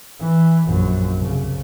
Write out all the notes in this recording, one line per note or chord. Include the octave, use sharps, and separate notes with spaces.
E3
A#1 F#2
C2 C#3